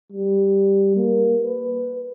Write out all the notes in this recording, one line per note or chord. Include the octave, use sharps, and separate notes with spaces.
G3
A#3
B4